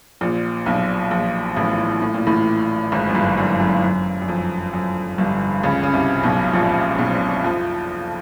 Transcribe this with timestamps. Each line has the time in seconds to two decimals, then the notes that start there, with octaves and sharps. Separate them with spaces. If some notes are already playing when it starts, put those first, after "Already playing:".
0.21 A#1 A#2
0.66 B1 B2
1.11 A#1 A#2
1.56 A1 A2
2.02 A2
2.14 A#2
2.27 A1 A2
2.92 G#1 G#2
3.09 F#2
3.14 G1 G2
3.37 F#2
3.60 F#2
3.83 F#2
4.22 F#2
4.28 F2
4.73 F#2
5.18 G1 G2
5.64 C#2 C#3
5.83 C#3
5.94 C2 C3
6.23 B1 B2
6.53 A#1 A#2
6.99 B1 B2
7.44 F2 F3